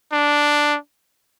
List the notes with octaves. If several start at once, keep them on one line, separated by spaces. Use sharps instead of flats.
D4